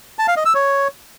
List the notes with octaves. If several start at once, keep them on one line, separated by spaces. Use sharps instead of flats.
A5
F5
D#5
E6
C#5